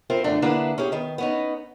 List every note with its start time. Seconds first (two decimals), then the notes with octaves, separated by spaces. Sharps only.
0.10 C4 E4 F4 A4 A#4 C5
0.24 F#2 D3 A3 D4
0.42 D3 A#3 D4 E4 G#4 B4
0.78 C#4 G4 G#4
0.92 D#3 B3
1.18 B3 C#4 D#4